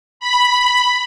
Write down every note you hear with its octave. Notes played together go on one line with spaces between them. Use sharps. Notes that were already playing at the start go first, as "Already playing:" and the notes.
B5